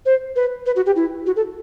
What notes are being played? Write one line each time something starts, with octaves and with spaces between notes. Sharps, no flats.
C5
B4
B4
F#4
G4
E4
F#4
A4